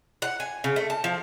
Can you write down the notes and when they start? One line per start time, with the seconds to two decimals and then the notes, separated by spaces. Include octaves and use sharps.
0.22 F#5
0.40 G#5
0.64 C#3
0.76 A3
0.90 A5
1.04 F3